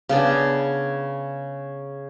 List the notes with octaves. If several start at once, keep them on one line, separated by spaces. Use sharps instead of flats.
C#3 B3 D4